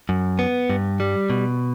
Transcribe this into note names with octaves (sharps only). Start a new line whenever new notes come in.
F#2
B3
G2
G3
B2